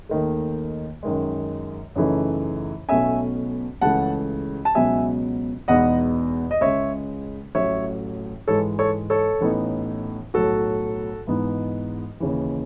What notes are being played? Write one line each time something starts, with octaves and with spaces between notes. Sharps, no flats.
D#2 D#3 A3
F#2 D#3 G#3
F#2 C#3 E3 A3 D#4
B1 B2 A3 C#4 E5 G#5
C#2 C#3 E3 A3 F#5 A5
A5
C#2 B2 F#3 E5 G#5
E2 B2 G#3 B3 D#4 D#5 F#5
D#5
C#2 C#3 G#3 C#5 E5
A1 A2 F#3 C#5 E5
G#2 E3 G#3 A4 C#5
A4 C#5
A4 C#5
A1 A2 E3 B3 D#4
B1 A2 F#3 F#4 A4
G#2 E3 B3 D#4
D#2 C#3 E3